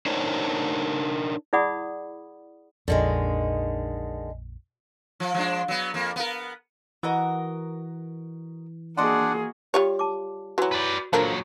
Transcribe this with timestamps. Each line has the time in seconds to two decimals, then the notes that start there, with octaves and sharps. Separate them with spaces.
0.06 D4 D#4 A#4 C5 C#5
1.53 E4 G#4 D5 F#5 B5 D#6
2.88 A#1 F2 D3 D#3 G#3
5.20 F3
5.34 F3 G#3 D4
5.68 F#3 B3
5.94 F2 A#3
6.16 B3 A#4
7.03 E3 F#4 A#4 D#5
8.97 A#3 D4 F#4 G#4 D5 D#5 F#5 C6
9.74 G3 F4 G4 C#5
9.99 A5 D6
10.58 E3 F#3 F#4
10.72 B4 D5
11.13 A#2 D3 F3 F#3 A#4